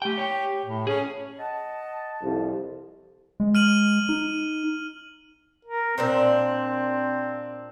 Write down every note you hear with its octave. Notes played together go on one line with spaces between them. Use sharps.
A3 G4 G5
C#5 G5
A2
C#4 G#4
D#5 F#5 A5
C2 F2
G#3
F6 D#7 F#7
D#4
A#4
A#2 C4 D4 C5